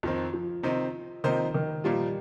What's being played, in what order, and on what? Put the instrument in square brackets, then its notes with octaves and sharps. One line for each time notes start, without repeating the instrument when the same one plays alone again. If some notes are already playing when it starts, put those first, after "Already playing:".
[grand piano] F2 D#3 C4 [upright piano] F3
[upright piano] F3
[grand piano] C3 D#3 C4 D#4
[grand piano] C3 F3 A#3 D#4 C5 [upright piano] D#3
[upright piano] D#3
[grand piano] A#2 F3 A#3 F4 [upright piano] G3